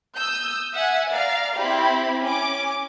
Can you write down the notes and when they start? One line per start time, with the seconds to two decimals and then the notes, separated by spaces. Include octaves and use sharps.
0.17 D#6 E6 G6
0.72 E5 F#5 G#5
1.11 D5 F5 A#5
1.57 C4 E4 G4 B5
2.24 C#4 D6